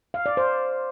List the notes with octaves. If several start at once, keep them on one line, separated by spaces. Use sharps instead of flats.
F5
D5
C5